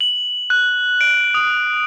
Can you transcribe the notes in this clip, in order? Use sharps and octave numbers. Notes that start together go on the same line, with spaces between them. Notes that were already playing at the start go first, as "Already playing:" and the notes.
F#7
F#6
D7
D#6